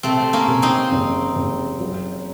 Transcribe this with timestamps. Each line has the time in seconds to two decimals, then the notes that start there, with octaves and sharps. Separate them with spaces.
0.03 C3 A3 C4
0.33 A#3 C#4
0.48 C3
0.62 C4 D#4
0.91 F#1
1.36 F#1
1.80 F#3